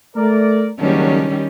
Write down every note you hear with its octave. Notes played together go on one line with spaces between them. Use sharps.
A3 A#4 D5
F#1 D#3 F#3 G3 C#4 D4